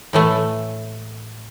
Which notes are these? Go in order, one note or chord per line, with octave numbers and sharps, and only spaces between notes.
A2 E3 A3